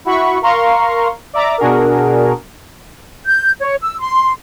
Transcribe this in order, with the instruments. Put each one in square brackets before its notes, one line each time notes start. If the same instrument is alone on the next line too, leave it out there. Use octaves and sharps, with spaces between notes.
[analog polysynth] E4 F#4 B5 C#6
A#4 F5 A#5 C6 C#6
D5 E5 A#5 D6
B2 D4 F#4 G#4 A#4
[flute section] G6
C#5
E6
C6